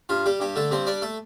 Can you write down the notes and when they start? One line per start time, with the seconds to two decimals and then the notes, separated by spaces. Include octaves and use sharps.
0.09 G2 F4
0.26 G3 G4
0.40 G2 G4
0.56 D3 A3 A4
0.71 G2 C4 C5
0.87 G3 D4 D5
1.02 A3 A4